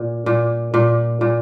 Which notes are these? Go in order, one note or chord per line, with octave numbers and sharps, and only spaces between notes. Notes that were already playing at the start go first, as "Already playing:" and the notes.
Already playing: A#2
A#2
A#2
A#2